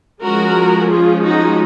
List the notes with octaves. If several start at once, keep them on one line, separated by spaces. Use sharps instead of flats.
F3 G#3 C#4 F#4 A#4
F4 G#4
D#4 F#4